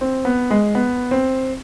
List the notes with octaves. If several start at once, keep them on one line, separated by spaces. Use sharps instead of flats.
C4
B3
G#3
B3
C4